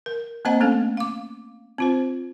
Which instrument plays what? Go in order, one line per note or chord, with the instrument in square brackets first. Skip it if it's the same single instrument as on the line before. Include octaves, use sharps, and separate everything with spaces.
[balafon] A#4
A#3 C4 C5 D#5 F#5 A#5
A3 B3 C#4 A4 F5
F5 D6
C4 F4 C5